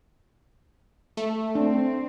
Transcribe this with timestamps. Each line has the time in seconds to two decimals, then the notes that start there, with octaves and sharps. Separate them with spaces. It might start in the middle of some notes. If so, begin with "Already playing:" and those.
1.17 A3
1.55 C4 D4